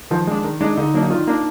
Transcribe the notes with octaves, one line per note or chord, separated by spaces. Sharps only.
D#3 F3
G#3 D4
D#3
G#3 D4 D#4
D3 D#4
F#3 A#3 D4
D#4
D#3 F4
A#3 D4